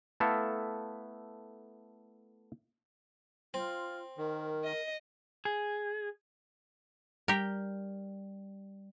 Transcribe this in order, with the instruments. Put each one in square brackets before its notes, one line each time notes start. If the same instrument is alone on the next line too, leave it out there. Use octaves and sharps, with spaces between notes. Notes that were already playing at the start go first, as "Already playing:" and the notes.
[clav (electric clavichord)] A3 B3 E4 A4 E5 F5
[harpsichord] C4 [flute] F4
[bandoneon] D#3 [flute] A#4
[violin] D#5
[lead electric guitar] G#4
[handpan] G3 [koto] G4 A#4